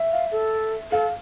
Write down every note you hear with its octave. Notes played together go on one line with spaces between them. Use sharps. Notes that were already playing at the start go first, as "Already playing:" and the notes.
Already playing: E5
F5
A4
A4 F5